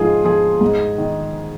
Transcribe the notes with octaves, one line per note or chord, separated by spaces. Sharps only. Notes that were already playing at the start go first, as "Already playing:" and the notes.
Already playing: G#2 F3 F4 G#4
F3 G#4
G#2
D#3